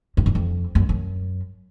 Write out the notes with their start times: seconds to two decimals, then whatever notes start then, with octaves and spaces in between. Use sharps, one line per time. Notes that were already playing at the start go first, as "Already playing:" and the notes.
0.17 F2
0.26 F#2
0.35 F2
0.75 F#2
0.89 F#2